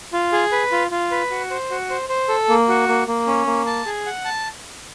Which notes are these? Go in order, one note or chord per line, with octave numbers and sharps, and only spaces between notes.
F4
G#4
B4
F4
F4
B4
F#4
C5
F#4
C5
C5
A4
A#3
F#4
A#3
A#3
C#4
A#3
A5
G#4
F#5
A5